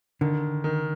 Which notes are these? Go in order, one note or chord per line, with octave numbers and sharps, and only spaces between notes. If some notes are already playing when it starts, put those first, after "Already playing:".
D3 D#3
D#3